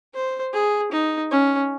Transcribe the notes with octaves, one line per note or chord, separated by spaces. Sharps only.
C5
G#4
D#4
C#4